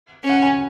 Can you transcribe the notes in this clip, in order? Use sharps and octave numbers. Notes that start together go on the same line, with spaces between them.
C#4 F#5
G#5